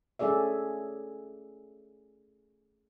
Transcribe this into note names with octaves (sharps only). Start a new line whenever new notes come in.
A3 C#4 G#4 D5 E5